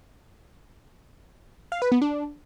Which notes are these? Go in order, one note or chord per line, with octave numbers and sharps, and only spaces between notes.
F5
B4
B3
D4